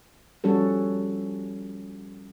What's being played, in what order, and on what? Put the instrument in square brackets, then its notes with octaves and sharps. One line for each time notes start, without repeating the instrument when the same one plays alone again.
[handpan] F3 G3 C#4 F#4 A4